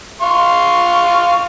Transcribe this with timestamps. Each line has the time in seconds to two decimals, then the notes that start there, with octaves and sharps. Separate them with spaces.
0.21 F5 C6 C#6